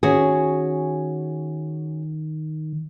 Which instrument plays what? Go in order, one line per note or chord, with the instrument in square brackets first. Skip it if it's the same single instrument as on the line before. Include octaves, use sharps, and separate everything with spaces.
[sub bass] D#3 [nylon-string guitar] C#4 F#4 G#4